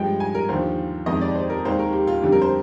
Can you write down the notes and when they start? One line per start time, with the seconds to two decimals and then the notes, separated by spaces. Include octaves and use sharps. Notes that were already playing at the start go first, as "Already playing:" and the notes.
Already playing: G2 F3 G#3 G5
0.20 G#5
0.35 A#4
0.49 D#2 D3 F3 C5
1.06 F2 D#3 G#3 D#5
1.21 D5
1.35 C5
1.50 A#4
1.65 D#2 D#3 G#3 C5
1.79 A#4
1.93 G4
2.07 F4
2.22 F2 D3 G3 G4
2.32 A#4
2.42 C5